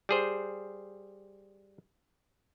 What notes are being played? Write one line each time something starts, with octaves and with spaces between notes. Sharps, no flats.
G3 G#4 C5